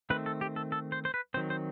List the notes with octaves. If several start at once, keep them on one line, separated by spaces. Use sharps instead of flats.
D#3 A3 C4 B4
A4
G4
A4
A4
C5
C5
B4
D#3 F#3 C4 C5
C5